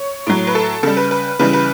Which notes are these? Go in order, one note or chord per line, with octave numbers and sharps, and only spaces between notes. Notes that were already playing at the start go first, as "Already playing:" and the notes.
Already playing: C#5
A2 F#3
B4
A4
C#3 G3 A4
B4
B4
C#3 E3 G3 B4
B4